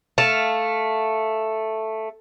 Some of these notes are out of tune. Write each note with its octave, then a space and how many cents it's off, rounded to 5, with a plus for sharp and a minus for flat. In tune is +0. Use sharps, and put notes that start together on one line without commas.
A3 +0 F5 +0 A5 +0